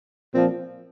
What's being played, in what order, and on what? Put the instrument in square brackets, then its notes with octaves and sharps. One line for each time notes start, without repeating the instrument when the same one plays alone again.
[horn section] A#2 F3 C4